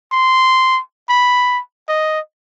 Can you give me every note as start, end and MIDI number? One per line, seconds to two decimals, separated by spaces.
0.12 0.80 84
1.09 1.60 83
1.88 2.20 75